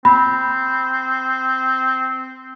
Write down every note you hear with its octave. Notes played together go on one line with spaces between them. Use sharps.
C4 B5